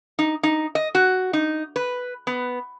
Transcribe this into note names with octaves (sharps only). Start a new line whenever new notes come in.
D#4
D#4
D#5
F#4
D#4
B4
B3